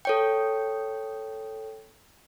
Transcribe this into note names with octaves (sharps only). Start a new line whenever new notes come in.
A4 C#5 G5